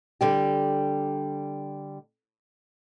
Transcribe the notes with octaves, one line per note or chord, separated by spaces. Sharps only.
D3 G3 G4